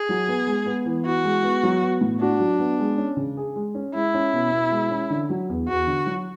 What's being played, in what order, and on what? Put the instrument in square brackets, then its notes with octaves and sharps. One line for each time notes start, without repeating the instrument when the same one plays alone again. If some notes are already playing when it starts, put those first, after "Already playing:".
Already playing: [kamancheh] G#4
[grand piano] F#3
B3
G#3
B3
E3
[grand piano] E4 [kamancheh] F#4
[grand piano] G#3
B3
F#3
B3
A2
[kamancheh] D4 [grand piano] F#4
[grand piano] F#3
B3
G#3
C#4
C#3
G#4
G#3
C#4
[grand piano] G#3 [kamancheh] E4
[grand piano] C#4
B2
B2
G#3
C#4
D3
F#3
E2
[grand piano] E2 [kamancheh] F#4
[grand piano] D3
F#3